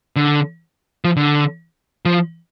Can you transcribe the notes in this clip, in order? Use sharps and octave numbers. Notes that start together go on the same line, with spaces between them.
D3
F3
D3
F3